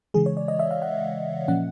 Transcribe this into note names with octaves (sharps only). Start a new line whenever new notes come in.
C#3 E3 G#3 G#4
C#5
D5
D#5
E5
F5
F#5
A#2 F3 A#3 C#4 F#5